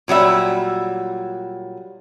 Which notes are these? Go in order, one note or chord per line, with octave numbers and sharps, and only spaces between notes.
A#2 F#3 G3 E5